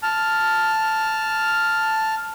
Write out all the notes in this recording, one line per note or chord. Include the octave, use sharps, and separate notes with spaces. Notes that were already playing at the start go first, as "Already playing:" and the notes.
A5 F6